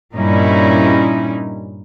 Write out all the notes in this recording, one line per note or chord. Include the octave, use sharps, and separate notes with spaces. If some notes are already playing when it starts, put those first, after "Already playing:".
G2 A#2 G3 C#4 D#4 E4